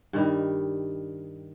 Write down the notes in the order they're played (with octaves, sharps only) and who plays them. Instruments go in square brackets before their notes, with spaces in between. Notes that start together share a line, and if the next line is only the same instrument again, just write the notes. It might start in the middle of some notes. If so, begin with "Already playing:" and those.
[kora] G2 D#3 G3